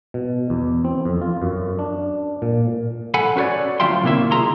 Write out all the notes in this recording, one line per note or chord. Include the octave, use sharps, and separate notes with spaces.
B2
E2
C4
F2
F4
F#2
D4
A#2
A4 F#5 G#5 B5
C#4 F#4 B4 C#5 D5
D2 F#3 F4 E5 G5 C6
C3 D#3 A#3 E4 E5
F4 G#4 A#5 C6